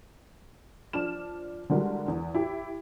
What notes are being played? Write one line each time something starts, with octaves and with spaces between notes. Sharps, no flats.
F3 D4 F6 E7
D3 G3 G#3 E4 F#4 A#4
E2
E4 G4